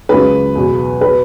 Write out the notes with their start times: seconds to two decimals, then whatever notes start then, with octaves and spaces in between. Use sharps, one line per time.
0.09 C#2 C#3 F#3 B4
0.55 E2 B2 F#3
1.01 B2 B4